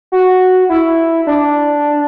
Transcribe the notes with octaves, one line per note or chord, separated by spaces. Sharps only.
F#4
E4
D4